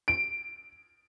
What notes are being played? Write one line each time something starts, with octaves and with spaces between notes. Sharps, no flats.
D7